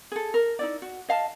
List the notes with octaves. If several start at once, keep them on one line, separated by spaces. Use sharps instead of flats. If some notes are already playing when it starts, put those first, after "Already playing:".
G#4 A4
A#4
D#4 E4 D5
F#4
D#5 F5 A5